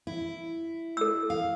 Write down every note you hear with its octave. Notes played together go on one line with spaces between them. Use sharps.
E4
A4 E6
F5